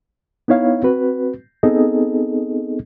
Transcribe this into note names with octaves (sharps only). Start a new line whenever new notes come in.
B3 D#4 E4 C#5 F5
C4 F#4 B4
B3 C4 D#4 G#4 A4 D#5